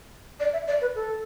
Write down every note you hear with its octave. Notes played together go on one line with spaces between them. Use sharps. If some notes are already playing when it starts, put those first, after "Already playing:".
D5
E5
D5
B4
A4